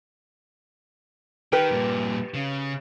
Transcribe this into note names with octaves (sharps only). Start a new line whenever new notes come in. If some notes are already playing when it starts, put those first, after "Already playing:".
D#3 G4 A#4 B4
G2 A#2
C#3